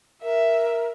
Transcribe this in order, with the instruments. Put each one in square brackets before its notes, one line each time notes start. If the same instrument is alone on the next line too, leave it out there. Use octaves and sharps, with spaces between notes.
[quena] A#4 [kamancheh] E5